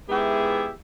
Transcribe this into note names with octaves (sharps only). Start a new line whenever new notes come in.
G#2 B3 E4 G4 G#4 E5